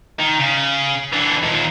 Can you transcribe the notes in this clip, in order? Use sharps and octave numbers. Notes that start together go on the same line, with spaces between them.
D#3
C#3
E3 D4
D#2 A#2